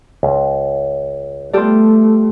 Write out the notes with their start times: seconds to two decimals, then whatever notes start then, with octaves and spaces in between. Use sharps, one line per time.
0.23 C#2
1.54 G3 A3 B3 F4 G4 A4 D5 C6